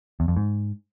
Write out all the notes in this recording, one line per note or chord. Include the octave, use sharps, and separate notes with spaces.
E2
F2
G#2